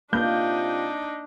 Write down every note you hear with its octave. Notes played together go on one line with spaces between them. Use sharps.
C3 A#3 D4 D#4 F4 G6